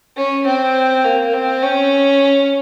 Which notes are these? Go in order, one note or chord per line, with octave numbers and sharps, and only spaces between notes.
C#4
C4
A#3
C4
C#4